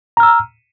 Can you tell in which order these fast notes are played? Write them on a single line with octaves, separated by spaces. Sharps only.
A#5 F6 E6